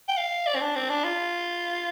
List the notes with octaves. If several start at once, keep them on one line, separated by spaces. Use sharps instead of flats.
G5
F5
D5
C4
D4
C4
D4
F4